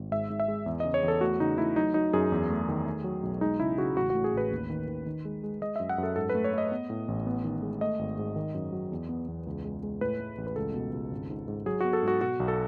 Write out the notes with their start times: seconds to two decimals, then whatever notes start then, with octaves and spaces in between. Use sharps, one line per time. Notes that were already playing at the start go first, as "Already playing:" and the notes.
Already playing: G#1
0.11 G#2 E5
0.30 G#2
0.40 E5
0.48 G#3
0.66 E2
0.80 C#3 D#5
0.94 C#5
1.03 E2
1.08 A4
1.21 A3 F#4
1.40 C#3 D#4
1.58 A3 E4
1.76 F#3 D#4
1.94 F#3 D#4
2.13 F#2 G#4
2.32 E2
2.50 A3
2.69 D#3
2.86 A3
3.04 F#3
3.23 B1
3.41 G#3 D#4
3.60 C#3 E4
3.78 C#3 F#4
3.97 A1 F#4
4.10 A2 F#4
4.24 G#4
4.33 A1 B4
4.51 D#2
4.70 D#3
4.88 D#3
5.06 D#3
5.25 G#3
5.43 G#3
5.62 G#3 D#5
5.76 F#2 E5
5.89 F#5
5.98 F#2
6.03 A4
6.16 G#2 A4
6.29 B4
6.35 A3
6.44 C#5
6.53 A3 D#5
6.72 B3
6.90 A2
7.08 A1
7.27 B3
7.45 D#3
7.62 G#3
7.81 A3 D#5
7.99 G#1
8.18 G#2
8.36 D#3
8.54 F#2
8.72 F#3
8.92 E2
9.09 B3
9.28 E2
9.47 C#2
9.65 G#3
9.83 G#3
10.01 A2 B4
10.20 A3
10.38 A1
10.47 B4
10.56 C#2 A4
10.74 B2
10.93 C#2
11.11 G#1
11.30 G#2
11.48 G#2
11.66 F#3 G#4
11.81 B3 F#4
11.93 A4
12.03 G#2 F#4
12.21 B2 F#4
12.40 B1
12.48 A4